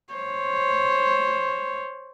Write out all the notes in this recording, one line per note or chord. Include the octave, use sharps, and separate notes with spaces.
C5 C#5